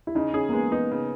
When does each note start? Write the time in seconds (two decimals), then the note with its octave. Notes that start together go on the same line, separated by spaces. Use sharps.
0.07 E4
0.15 C#3 D#4
0.34 C#4 G#4
0.49 A#3
0.53 G#3 B3
0.71 B3 D#4
0.92 C#3